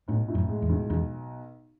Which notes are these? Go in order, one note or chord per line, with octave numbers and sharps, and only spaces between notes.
B1 A2
A2
F#2
G#3
E2
B1
B1 E2